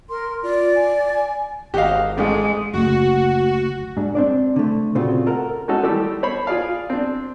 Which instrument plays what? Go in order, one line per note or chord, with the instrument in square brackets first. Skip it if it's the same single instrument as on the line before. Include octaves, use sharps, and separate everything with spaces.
[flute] A#4 [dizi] C6
[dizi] F4 [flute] D5
[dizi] G#5
[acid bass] G#1 [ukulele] F#4 F5 [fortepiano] G4 D#5
[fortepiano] A1 A3 [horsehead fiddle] G#3
[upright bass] F#1 D2 [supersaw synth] F#4
[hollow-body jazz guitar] G#2 D4
C4 D4 D5
D3 A3
A#2 C#3 A3 C4 F4 F#4
A4 A#4 F#5
[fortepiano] G#3 C#4 D#4 F#4 A4
D#3 E3 G3 A3 G4 E6
C5 C#5 B5
F4 G#4 D5 F5
C4 D4